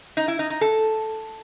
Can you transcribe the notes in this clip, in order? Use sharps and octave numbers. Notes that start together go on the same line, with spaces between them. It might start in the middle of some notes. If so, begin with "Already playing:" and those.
D#4
E4
D#4
D#4
A4